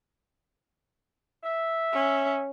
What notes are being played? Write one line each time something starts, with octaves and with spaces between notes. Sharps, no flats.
E5
C#4